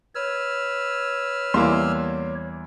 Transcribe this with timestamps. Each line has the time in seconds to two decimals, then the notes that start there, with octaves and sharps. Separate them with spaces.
0.15 B4 C#5 E6 F6
1.54 E2 G3 A#3 C6